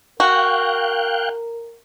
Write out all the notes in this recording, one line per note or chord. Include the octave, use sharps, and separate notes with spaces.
F#4 A#4 F5 G5 F#6